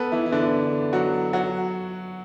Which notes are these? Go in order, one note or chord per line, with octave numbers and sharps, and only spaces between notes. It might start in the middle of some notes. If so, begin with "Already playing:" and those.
Already playing: B3 A4 B4
E3 E4
E4
D3 D4
F#3 F#4
F#3 F#4